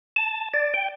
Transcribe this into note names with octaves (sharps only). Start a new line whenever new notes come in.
A5
D5
G5